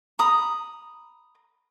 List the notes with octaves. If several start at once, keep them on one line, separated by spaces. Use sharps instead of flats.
A#5 B5 D#6